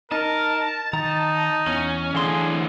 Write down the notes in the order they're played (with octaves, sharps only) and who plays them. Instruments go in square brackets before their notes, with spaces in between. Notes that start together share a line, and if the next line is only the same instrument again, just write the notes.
[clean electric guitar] D#4 [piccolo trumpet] A#4 [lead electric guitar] A5
[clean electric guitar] D#3 A#5 [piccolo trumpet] D#4
[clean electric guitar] E2 [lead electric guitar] C#4
[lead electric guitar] A2 D3 [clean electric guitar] E3 C6 [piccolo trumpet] G#4